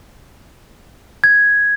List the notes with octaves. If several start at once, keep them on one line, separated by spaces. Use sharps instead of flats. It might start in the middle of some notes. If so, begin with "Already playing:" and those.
G#6